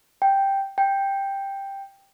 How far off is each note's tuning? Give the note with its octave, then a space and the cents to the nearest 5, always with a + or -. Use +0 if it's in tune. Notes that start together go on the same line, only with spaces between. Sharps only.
G5 +0
G5 +5